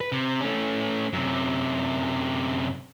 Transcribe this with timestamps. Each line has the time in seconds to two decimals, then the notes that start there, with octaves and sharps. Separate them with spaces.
0.01 B4
0.12 C3
0.41 A3 C#4
1.13 F#2 C3